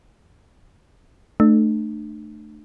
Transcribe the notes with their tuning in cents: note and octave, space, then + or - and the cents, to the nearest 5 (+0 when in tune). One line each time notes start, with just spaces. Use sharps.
A3 +0 D4 +40